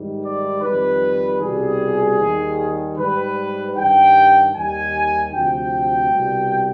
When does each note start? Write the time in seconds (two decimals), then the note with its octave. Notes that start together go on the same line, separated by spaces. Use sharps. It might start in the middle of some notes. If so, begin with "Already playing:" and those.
Already playing: G#2 D#3 G3
0.23 D5
0.62 F2 D#3 G3 B4
1.41 C2 B2 G3 G#4
2.19 D#2 D#3 G3
2.98 G#2 G3 B4
3.76 G2 D#3 G3 G5
4.54 D#2 D#3 G3 G#5
5.33 D2 C3 F3 G5
6.11 C2 B2 G3